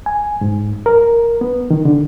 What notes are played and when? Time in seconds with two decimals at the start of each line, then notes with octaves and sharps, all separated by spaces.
0.06 G#5
0.41 G#2
0.86 A#4
1.41 B3
1.71 D#3
1.85 D3